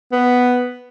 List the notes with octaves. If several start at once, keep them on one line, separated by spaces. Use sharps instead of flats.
B3